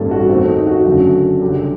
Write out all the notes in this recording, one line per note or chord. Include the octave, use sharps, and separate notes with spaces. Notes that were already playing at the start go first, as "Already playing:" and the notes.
Already playing: A1 G2 D#3 G3 A#3 A4
F#4
D#2 D#3 A3 C4 F#4
D#4
F#4
F#1 F#2 D3 A3 F#4
F#1 F#2 D3 G3 G4